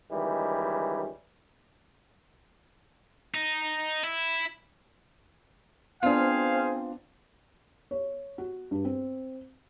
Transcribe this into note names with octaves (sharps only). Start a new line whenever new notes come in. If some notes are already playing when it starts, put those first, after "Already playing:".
C#2 D#3 E3 G3
D#4
E4
B3 C4 D4 F4 G#4 C5 F5
C#5
F#4
G2
C4